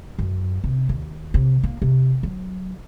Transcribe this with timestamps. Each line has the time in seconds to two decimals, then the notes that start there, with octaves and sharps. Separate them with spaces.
0.19 F#2
0.64 C3
0.89 D#2
1.34 C3
1.63 A#3
1.82 C3
2.23 F#3